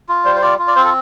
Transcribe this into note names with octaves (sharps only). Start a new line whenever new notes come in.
F4
G3 C5
C5
F4 D5
F4
D5
C4 C5
A4